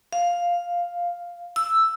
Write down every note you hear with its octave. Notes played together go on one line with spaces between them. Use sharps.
F5
E6